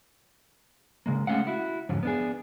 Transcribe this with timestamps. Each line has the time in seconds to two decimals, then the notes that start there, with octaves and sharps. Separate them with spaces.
1.06 C#3 G#3 A#3
1.27 G#3 A3 C#4 F5 F#5
1.47 E4 F#4
1.89 F2 G#2 D3 F#3 C#4
2.03 B3 D4 G#4